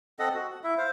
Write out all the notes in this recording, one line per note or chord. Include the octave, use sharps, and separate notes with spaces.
C4 A4 D#5 F#5
F#4
F#5
E4 E5
C5 F5